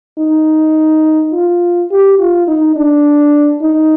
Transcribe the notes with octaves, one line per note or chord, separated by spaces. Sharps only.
D#4
F4
G4
F4
D#4
D4
D#4